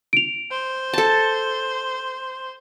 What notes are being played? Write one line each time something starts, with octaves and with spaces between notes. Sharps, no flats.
D7 F7
C5
A4 A5